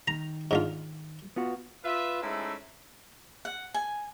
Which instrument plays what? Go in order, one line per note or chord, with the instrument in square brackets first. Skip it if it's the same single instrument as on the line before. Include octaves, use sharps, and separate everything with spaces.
[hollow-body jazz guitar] D#3 [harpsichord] A#5
[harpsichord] G#2 D3 F4
[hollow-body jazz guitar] B3 F4 F#4
[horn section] F4 B4 E5
G#2 G#3 A3 C#4 E4
[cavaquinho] F#5
G#5